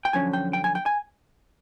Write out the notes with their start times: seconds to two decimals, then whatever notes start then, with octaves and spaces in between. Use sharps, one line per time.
0.05 G5
0.13 F#2 D3 F3 C#4 G#5
0.33 G5
0.53 G5
0.64 G#5
0.75 G5
0.86 G#5